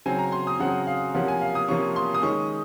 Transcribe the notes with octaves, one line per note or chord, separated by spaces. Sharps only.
C#3 F#3 C4 G#5
A#5
C6
D#6
C#3 F#3 C4 F#5
F5
C3 F3 A#3 C#4 F#5
G#5
F5
D#6
C3 F3 A#3 C#4 C#6
C6
D#6
D#3 G#3 C#4 C#6